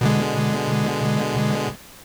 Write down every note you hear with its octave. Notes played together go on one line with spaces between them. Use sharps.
B2 D3 G#3